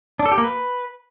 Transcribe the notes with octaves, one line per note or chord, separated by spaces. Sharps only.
D4
A4
G4
A#3
B4